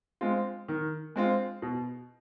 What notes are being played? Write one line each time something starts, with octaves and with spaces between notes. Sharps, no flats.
G#3 C4 F4
D#3
G#3 C4 F4
B2